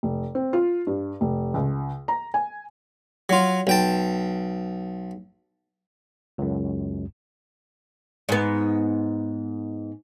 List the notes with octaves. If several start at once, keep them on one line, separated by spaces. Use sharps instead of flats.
F1
C4
F4
G2
F1
C#2
A#5
G#5
F#3 F4
B1 G5 A5
C#2 F#2
G#2 B3